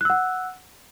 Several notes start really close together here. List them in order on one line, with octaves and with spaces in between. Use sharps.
F#6 E6 F#5